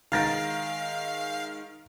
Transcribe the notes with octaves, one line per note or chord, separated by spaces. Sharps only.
D#3 G#3 F5 A#5 A6 A#6 D7